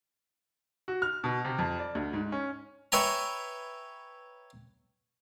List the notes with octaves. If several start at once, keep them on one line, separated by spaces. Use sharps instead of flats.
F#4
F6
B2
C3
F2
D5
D2
G#2
C#4
B4 C#5 E5 G5 G#5 A#5